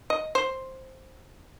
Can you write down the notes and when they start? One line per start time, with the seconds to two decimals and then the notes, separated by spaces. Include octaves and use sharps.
0.10 D#5
0.35 C5